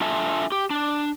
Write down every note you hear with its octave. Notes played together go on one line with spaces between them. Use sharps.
D4 F4 A4 E5 G#5 A5
G4
D4